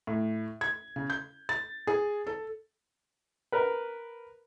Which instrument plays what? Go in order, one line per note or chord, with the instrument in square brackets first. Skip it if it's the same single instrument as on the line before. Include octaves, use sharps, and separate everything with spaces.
[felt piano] A2
G#6
C#3
G6
A6
G#4
A4
[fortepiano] A#4 B4